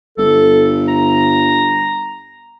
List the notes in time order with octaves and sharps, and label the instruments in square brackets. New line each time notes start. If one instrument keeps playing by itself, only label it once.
[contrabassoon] G1 [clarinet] A4
[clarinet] A#5